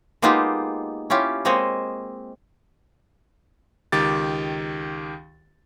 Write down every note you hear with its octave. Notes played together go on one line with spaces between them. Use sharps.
G#3 A#3 B3 D#4 F4 G4
C#4 E4 F4 G4
G#3 A#3 C4 C5 C#5 D#5
C#2 D#3 G4 D6 A6